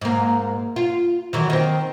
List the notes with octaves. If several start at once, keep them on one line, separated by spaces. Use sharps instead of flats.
G#2 A#3
F4
D#3 E3 F#3
D#3 C4